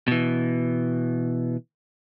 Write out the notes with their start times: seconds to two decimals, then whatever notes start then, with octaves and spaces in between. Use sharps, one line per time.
0.08 B2 E3